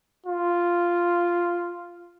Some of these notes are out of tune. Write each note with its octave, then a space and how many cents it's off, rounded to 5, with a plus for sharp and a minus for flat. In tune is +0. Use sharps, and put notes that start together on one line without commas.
F4 -5